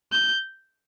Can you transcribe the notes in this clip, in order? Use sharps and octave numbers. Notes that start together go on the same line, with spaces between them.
G6